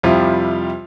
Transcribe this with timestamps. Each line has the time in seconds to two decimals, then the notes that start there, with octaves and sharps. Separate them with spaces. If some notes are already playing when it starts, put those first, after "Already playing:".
0.03 F2 C3 F3 G3 E4 F4